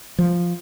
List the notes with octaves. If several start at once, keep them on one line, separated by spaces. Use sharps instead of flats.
F3